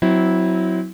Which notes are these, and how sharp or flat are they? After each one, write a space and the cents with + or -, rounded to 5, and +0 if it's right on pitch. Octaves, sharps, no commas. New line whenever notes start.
F#3 +0 C4 -20 E4 -15